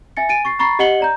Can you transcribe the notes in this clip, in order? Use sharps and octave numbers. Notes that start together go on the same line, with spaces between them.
E5 G#5 A6 C#7
G#5 A6 D7 D#7
C#6 A6 C7
A#5 B5 C#6 A6 C7
G4 D#5 F#5 C#7 F#7 G7
D5 A#5 G6